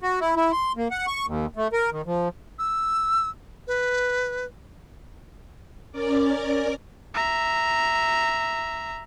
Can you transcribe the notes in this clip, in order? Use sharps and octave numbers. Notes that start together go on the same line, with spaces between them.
F#4
E4
E4
C6
A#3
F#5
C#6
D#2
A3
A#4
D#3
F3
E6
B4
C#4 A#4 D5 D6
E5 A#5